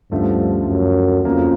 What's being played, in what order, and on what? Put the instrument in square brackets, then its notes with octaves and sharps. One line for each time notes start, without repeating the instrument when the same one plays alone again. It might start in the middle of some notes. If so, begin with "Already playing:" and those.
[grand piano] D2 C#3 F3 A3 [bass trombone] G2
[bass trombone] F#2
[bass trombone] F2 [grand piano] C#3 F3 A#3